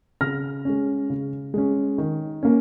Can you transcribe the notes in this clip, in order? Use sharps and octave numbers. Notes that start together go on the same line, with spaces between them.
C#3 F6 A#6
G#3 C#4
C#3
G#3 C#4
D#3
A#3 C#4